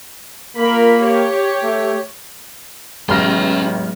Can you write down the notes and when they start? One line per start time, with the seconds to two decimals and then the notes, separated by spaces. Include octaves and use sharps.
0.56 A#3 F4 A#4 B5
1.00 G4 C#5
1.62 A3
3.09 A1 F#3 G#3 B3 C#4 C6 F6 A#6